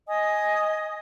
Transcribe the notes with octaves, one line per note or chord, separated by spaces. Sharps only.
D#5 G#5 D#6